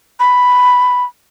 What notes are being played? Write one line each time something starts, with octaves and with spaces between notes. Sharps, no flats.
B5